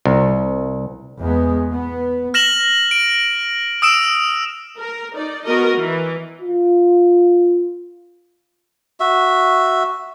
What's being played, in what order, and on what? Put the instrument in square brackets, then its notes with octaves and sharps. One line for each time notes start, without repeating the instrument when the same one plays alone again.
[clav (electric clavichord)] C2
[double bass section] E2 G#3 B3
B3
[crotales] F6 A#6 E7 F#7
D7
D#6 E6 D7 E7
[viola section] A#4
D#4 D5
B3 F#4 A#4 D#5
E3
[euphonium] F4
[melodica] F#4 E5